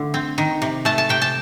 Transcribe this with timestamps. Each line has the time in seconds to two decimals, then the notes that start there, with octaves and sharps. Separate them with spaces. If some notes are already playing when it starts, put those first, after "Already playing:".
Already playing: D3 A3
0.14 C4
0.38 D#3
0.62 C3
0.85 A3 A5
0.98 A5
1.09 C3 G5
1.22 A5